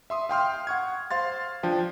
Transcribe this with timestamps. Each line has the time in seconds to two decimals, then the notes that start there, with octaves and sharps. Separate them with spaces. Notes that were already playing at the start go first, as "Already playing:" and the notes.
0.10 E5 C6 D#6
0.29 F5 G5 C6 F6
0.67 F#5 C#6 G#6
1.11 C5 F5 C6 A6
1.63 F3 D4 G5